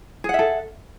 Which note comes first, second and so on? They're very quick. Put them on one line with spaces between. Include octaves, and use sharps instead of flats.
G#4 F#5 E5 A4